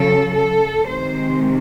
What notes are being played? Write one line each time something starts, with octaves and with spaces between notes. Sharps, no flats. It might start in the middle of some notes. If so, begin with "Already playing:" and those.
Already playing: C#3 F#3 A4
A4
C3 D#3 G#3 C5